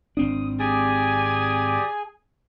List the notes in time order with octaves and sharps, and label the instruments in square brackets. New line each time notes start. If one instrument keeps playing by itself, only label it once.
[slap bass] G#1 C4 D4 [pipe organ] D#6
[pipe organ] G4 D5 D#6 [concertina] G#4 [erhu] G#5